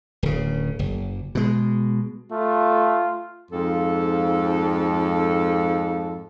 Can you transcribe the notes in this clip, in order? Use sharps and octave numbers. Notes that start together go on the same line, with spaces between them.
D1 C#3
F#1
B2 G#3
A3 F4
F2 G#2 F4 A4